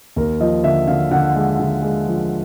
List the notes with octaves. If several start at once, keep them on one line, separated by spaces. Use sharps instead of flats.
D#2 A#4
F3 D#5
D3 E5
D3 F5
D3 F#5
G#3
D3
G#3
F3